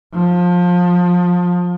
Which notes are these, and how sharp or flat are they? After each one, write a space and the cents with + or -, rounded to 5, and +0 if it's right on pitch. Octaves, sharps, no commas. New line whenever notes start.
F3 +25